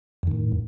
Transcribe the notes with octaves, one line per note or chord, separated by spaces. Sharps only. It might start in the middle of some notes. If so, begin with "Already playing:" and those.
F2 A2 D#3